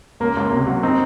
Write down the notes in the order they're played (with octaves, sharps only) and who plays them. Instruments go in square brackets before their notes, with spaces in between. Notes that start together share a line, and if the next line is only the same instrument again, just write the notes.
[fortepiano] C#2 A#3
C#2
C3 A#3
F#3
C4 D#4